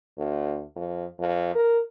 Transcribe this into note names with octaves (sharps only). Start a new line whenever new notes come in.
D2
F2
F2
A#4